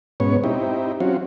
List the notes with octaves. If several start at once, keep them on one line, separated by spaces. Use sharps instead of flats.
G#2 B2 B3 C#4 C#5
C4 D#4 E4 G4
F#3 C4 C#4 F4 F#4